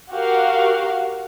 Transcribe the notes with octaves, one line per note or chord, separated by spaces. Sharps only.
F#4 G4 A#4 F5